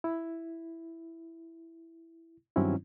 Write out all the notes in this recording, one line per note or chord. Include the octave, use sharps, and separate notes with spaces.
E4
G2 D#3 F#3 C4 C#4 E4